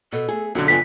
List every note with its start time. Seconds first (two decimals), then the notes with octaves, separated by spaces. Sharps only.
0.12 B2 A4
0.28 A3 G#4
0.55 B1 D3 C#4 F#4 A4
0.68 G2 B3 F4 G#5 B6